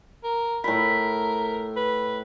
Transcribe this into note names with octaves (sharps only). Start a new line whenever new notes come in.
A#4
A2 A#4 B5
B4